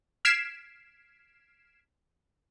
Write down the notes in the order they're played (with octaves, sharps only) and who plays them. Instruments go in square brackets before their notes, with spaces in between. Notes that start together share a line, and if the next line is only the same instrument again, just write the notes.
[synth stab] F6 G#6 B6 C7 D7 E7